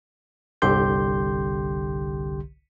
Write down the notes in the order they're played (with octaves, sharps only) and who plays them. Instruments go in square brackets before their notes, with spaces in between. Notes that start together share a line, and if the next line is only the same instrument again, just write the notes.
[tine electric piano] G1 C2 D3 G4 C6 G6